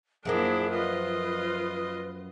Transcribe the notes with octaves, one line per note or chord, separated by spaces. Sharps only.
F#2 F3 A#3 D4 E4 G#4
F4 B4 D#5